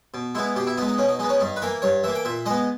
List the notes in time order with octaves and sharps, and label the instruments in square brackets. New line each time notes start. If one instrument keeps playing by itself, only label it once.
[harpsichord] B2
G#3 B3 E4
B2 G4
E4
G#3 B3 D#4
D#4
B2 C#4
D#4
G#3 B3 D#4
C#4
G2 D#4
B4
E3 A#3 A#4
G2 C#5
E3 A#3 E5
G5
A#2 E5
G#3 B3 D#5